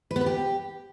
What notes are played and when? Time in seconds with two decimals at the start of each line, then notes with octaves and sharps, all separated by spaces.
0.11 B4
0.16 B3
0.21 B4
0.26 G4